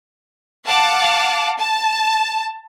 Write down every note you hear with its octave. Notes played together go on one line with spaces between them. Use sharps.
F5 F#5 A5 D6
A5